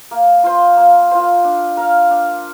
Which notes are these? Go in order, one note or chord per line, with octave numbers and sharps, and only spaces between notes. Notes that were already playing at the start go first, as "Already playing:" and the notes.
A#3
F4 C5
A#3
F4 C5
D4
A#4 F5
D4